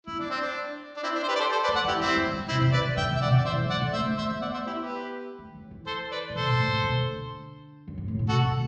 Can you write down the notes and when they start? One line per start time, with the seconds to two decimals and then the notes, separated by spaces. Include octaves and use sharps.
0.07 B3 E4
0.19 D4
0.30 C4
0.42 D4
0.97 D4
1.03 C4 E4
1.16 D4
1.23 C5
1.28 G4 B4
1.36 D5
1.39 A4 C5
1.52 A4 C5
1.64 B4 D5
1.68 A3
1.76 D5 F#5
1.85 G3 E4 G4
2.01 F#3 C4 E4
2.16 G3
2.33 F#3
2.49 C3 C4 E4
2.61 C3
2.72 D3 B4 D5
2.97 D3 E5 G5
3.12 B2
3.17 E5
3.21 C3 D5 F#5
3.34 D3 D5
3.45 E3 C5 E5
3.58 D3
3.65 F#3
3.70 E3 D5 F#5
3.81 D3
3.93 A3 C5 E5
4.06 A3
4.17 B3 C5 E5
4.31 B3
4.42 D5 F#5
4.54 C5 E5
4.67 E4 G4
4.78 G4 B4
5.39 A3
5.55 F#3
5.71 E3
5.87 A4 C5
6.11 B4 D5
6.29 A2
6.35 B2 A4 C5
6.48 A2
6.60 A2
6.72 B2
6.84 D3
7.88 F#2
7.98 G2
8.08 A2
8.19 B2
8.29 C3 F#4 A4
8.45 D3